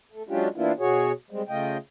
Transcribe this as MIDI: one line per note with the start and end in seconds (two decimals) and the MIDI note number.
0.12 0.23 57
0.29 0.48 54
0.29 0.48 56
0.29 0.48 61
0.29 0.48 62
0.29 0.48 65
0.29 0.48 67
0.56 0.72 52
0.56 0.72 58
0.56 0.72 59
0.56 0.72 62
0.56 0.72 64
0.56 0.72 65
0.79 1.12 47
0.79 1.12 66
0.79 1.12 68
0.79 1.12 73
1.31 1.42 55
1.31 1.42 56
1.31 1.42 60
1.49 1.77 49
1.49 1.77 57
1.49 1.77 65
1.49 1.77 75
1.49 1.77 79